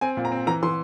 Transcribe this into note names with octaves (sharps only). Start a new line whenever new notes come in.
C4 G#5
A#2
A#5
C4
E3 A#5
E3 C6